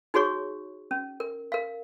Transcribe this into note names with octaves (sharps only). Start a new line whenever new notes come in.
D#4 F#4 G#4 C#5 C#6
C#4
A#4
A#4 F5